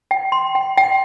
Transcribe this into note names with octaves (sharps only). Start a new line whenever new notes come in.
G5
C6
G5
G5